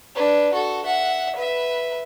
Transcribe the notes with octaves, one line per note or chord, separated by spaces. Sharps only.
D4 B4
F#4 A4
E5 F#5
B4 E5